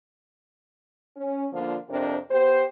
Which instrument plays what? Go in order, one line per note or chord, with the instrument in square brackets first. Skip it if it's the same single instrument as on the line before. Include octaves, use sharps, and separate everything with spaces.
[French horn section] C#4
D3 F3 A#3 D4 F4
F2 C3 D4 A#4 C5
B3 G4 C5